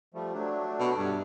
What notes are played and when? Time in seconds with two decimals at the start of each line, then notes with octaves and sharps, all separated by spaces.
0.14 F3 G3 A3
0.34 F#3 A3 D4
0.80 B2
0.98 G2